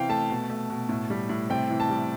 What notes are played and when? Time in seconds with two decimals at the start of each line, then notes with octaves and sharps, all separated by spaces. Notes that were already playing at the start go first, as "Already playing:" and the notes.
Already playing: C3 E3 F5 G5
0.09 A3 A5
0.30 B2
0.50 A3
0.70 B2
0.89 A2
1.10 G3
1.29 A2
1.50 C3 G5
1.70 E3
1.80 A5
1.90 G3